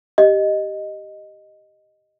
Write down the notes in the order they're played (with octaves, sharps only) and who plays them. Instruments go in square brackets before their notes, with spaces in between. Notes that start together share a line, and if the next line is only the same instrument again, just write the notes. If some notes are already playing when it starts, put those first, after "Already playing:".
[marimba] G4 [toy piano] D#5